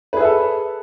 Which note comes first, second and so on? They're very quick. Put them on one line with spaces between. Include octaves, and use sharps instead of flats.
B4 G#4 E5 A4